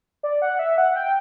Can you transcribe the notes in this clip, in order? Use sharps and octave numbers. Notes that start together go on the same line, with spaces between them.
D5
F#5
E5
F#5
G5